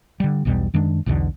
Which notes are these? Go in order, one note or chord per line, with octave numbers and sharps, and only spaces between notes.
D3 G3
B1 E2 B2 G3
F#2 D#3 G#3 D4
B1 E2 B2 D3